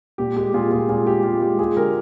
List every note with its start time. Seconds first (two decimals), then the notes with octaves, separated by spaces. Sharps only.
0.18 A#2 G4
0.36 G#3 G4
0.54 A#2 F4 G#4
0.71 A#2 F4 G#4
0.89 A#2 F4 G#4
1.07 G#3 G4
1.24 G#3 F4
1.41 G#3 G4
1.59 G#3 F4 G#4
1.77 D3 G4 A#4